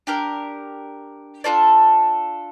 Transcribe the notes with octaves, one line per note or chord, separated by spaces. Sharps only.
D4 G4 A#4
D4 F4 A4 D5